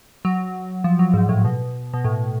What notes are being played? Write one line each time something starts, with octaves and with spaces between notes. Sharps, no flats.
F#3
F3
F#3
G#2
A2
B2
B2
A2